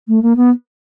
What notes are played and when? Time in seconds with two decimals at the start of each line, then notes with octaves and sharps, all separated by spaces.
0.08 A3
0.22 A#3
0.36 B3